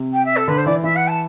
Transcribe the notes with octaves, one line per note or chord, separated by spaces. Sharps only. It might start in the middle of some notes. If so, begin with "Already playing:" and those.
Already playing: C3
G5
E5
A4
D3 B4
C5
E3 D5
E3 E5
F#5
A5